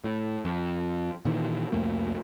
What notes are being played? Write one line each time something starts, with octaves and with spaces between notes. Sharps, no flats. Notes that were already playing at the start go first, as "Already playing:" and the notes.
A2
F2
A#2 D#3 E3
C2 F2 A3 A#3